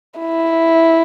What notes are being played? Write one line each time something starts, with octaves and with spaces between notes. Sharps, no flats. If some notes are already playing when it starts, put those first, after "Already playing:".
E4